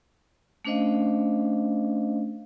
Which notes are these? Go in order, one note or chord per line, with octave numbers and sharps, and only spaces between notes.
A3 C#4 D4 C5 D#5 F5